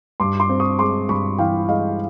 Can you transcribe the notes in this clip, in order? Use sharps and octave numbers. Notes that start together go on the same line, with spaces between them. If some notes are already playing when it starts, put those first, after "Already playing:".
G2 C6 D6
C6 D6
C4
C#6 D#6
G#3 C6 D6
G2 B5 C#6
E3 F5 G5
G#3 D#5 F5